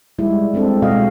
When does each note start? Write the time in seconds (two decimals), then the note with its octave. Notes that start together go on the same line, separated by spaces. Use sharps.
0.19 G3 G#3 E4
0.54 G#3 C4 D4 A4
0.82 B2 G#3 F#4 D#5 F5